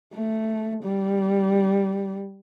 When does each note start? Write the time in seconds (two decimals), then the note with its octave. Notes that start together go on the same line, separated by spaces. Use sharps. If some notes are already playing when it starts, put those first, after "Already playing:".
0.14 A3
0.83 G3